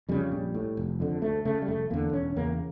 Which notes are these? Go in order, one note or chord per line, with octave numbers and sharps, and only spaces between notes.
F2 C#3 G3
A#1
A2
F1
F2 D3
D2 A3
C#3 A3
G3
F1 A3
E2 D3 A#3
E1 C#4
E2 C#3 A#3